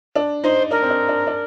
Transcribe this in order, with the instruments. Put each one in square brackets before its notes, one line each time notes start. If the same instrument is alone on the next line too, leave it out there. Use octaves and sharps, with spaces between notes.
[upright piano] D4
[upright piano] D#4 [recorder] C5
[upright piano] D4 [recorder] A#4
[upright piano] C4
D4
D4
D4